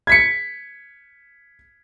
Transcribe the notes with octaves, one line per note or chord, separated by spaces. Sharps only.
G#6 B6 C#7